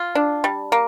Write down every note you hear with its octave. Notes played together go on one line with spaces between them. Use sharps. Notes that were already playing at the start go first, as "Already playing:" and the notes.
Already playing: F4
D4
G3
A#3